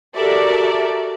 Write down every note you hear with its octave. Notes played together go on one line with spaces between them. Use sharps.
F#4 G4 A4 A#4 D5 E5